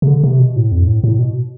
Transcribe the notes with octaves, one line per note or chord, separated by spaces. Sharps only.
C3
D3
C3
B2
A2
F2
A2
A2
B2